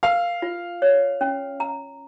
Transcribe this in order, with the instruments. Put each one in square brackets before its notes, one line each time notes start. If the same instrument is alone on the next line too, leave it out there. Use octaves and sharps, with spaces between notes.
[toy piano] A#4 [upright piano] F5
[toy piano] F4
C#5
C#4
A#5